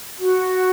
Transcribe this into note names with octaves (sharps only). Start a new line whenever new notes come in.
F#4